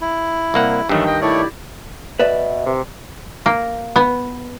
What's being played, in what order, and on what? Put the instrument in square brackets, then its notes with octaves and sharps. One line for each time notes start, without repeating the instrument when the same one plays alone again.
[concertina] E4
[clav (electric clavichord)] C2 A#3 F#5
[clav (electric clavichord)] G2 D#3 [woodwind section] E3 F#3 A3
[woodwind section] D#5 G5
[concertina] A3 C#5 [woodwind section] E4 G4 D5
[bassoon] B2 [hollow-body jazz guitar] B4 D5 E5
[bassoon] C3
[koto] A#3
B3